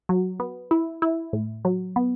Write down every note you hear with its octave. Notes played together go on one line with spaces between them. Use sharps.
F#3
B3
E4
E4
A2
F#3
B3